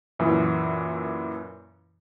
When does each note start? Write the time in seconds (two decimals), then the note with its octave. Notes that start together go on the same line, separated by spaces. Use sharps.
0.19 F#2 A#2 E3